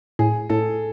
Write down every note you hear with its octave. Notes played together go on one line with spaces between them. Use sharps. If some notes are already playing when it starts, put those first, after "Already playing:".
A2 G#4
A2 A4